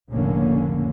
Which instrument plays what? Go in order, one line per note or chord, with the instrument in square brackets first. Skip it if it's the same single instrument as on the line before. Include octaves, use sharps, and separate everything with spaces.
[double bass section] F1 C#2 A2 D3 A#3 C#4